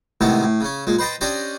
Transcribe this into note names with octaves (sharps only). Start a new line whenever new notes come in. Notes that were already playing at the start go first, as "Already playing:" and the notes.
A2 C3 D#3 G#3 B3
A2
C#3 C#4
A#2 G#3
B4 C5 D#5 G5 A5
C#4 D4 G4 C5 D5 D#5